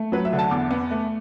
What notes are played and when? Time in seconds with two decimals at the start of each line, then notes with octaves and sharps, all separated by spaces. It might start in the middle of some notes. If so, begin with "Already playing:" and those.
Already playing: A3
0.12 F#3 B4
0.25 E5
0.33 D3
0.39 A5
0.51 E2 D6
0.71 B3
0.91 A3